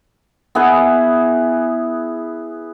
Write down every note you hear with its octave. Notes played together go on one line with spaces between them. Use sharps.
B3 E4 G#4 B4